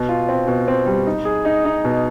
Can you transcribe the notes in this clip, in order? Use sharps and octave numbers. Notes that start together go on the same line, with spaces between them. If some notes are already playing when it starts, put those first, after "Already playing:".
Already playing: B2
F4
C4
B2
C4
G3
D#4
G#4
D#4
D#4
B2